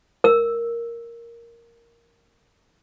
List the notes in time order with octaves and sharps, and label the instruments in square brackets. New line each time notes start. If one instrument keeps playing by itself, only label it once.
[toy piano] A#4 E6